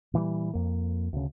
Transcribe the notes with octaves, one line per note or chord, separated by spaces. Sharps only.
A#2 E3 F3 G3
F2 A#3
D2 C#3